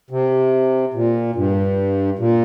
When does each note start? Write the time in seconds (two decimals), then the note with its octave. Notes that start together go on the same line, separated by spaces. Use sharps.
0.11 C3
0.94 A#2
1.36 G2
2.19 A#2